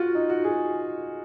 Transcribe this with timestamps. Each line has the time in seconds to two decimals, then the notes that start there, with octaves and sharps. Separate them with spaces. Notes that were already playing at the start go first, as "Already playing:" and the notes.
Already playing: F4 F#4
0.15 D#4
0.30 F#4
0.44 G#4